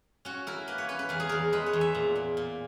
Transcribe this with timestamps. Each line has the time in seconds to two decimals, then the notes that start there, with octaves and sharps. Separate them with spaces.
0.25 C#4 F#4
0.47 E4 A#4
0.67 A#3 B4
0.78 C#5
0.89 C#4 B4
0.99 B4
1.09 E2 A#4
1.20 G#4
1.29 E2 A#4
1.53 G#3 B4
1.66 C#5
1.73 E2
1.81 E5
1.95 A#2
2.16 A#2
2.37 A#2